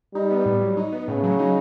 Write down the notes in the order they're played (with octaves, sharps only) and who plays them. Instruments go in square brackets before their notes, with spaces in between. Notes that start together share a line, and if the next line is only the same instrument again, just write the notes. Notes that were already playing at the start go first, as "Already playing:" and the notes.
[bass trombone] G3 [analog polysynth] D#4
[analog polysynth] B3
A2
F#3
D#4
B3
[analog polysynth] A2 [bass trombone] C#3
[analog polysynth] F#3
D#4